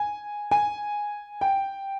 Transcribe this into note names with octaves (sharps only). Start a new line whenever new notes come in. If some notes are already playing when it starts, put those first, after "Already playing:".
Already playing: G#5
G#5
G5